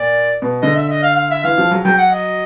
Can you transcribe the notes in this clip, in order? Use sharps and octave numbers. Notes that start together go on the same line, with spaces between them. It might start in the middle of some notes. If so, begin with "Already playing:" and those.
Already playing: A#2 D5
B2
D3 D#5
E5
D#5
F5
F5
E5
E3 F5
F3
F#3
F#3 G5
F#5
D#5